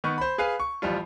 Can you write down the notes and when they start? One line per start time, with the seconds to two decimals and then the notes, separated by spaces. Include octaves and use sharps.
0.04 D#3 B3 B4 C#6
0.18 C5 B5
0.38 G#4 B4 F5 G#5
0.60 C#6
0.82 A1 F3 G3 F4